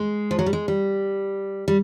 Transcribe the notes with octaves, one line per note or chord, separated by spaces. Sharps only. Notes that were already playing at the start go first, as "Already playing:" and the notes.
Already playing: G#3
F3
F#3
G3
G#3
G3
G3